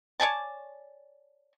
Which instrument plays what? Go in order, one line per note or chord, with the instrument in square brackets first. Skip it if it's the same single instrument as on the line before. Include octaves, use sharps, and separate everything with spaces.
[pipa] C#5 D5 G#5 A5